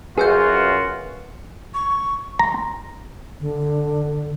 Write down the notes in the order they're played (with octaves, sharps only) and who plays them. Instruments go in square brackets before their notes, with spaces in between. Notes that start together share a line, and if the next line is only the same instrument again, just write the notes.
[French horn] F#2 [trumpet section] F4 F#4 [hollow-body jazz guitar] G#4 [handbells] B4 G#5 G6
[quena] C#6
[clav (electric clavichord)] A#5 [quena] C6
[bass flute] D3